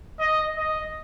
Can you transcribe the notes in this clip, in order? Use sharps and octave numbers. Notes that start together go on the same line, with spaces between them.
D#5
D#5